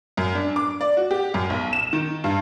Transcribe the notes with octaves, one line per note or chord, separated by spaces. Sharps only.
F#2
D4
D6
D5
F#4
G4
F#2
B1
E7
D#3
G2